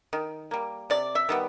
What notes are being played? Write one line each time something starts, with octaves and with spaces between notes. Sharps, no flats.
D#3
G3 A#3
C3 D5
E5
D#3 G3 B3